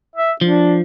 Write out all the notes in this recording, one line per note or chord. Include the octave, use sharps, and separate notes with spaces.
E5
F3 D4